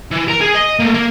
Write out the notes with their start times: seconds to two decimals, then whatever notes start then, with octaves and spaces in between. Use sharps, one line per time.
0.11 E3
0.28 A#4
0.41 G#4 G#5
0.55 D#5
0.79 A3 A#3
0.94 A#3 A#4